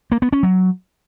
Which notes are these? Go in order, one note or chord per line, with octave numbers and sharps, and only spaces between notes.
A#3
B3
C#4
F#3